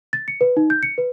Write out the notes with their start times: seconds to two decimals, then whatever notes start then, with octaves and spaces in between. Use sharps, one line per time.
0.13 A6
0.28 C#7
0.41 B4
0.57 D#4
0.70 G6
0.83 C#7
0.98 B4